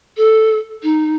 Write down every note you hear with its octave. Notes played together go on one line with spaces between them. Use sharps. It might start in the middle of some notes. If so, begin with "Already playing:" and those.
A4
D#4